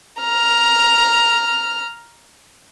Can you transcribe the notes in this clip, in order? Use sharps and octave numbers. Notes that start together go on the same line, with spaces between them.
A#5 F6